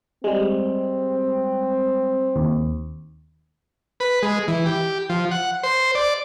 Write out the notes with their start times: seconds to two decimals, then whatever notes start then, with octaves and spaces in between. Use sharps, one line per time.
0.24 G3 G#3 C4
2.36 D#2
4.00 B4
4.22 G#3
4.48 E3
4.66 G4
5.09 F3
5.31 F#5
5.63 C5
5.95 D5